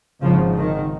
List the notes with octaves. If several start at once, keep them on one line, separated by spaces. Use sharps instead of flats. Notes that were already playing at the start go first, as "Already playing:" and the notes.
G#1 G#2 C#3 F3
D#3